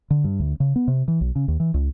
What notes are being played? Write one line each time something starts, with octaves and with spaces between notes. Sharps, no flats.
D3
G2
D2
C#3
B3
C3
E3
B1
C#3
D#2
E3
C#2